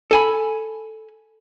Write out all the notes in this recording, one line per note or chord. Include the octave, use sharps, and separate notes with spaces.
A4 G#5 B5